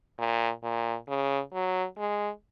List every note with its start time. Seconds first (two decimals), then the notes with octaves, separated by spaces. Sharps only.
0.19 A#2
0.64 A#2
1.08 C#3
1.54 F#3
1.98 G#3